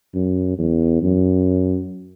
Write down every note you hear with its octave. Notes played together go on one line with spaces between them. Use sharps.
F#2
E2
F#2